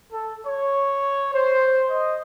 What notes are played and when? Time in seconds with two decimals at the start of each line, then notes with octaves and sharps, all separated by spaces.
0.12 A4
0.46 C#5
1.34 C5
1.90 D#5